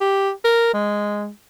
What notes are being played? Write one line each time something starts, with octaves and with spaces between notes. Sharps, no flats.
G4
A#4
G#3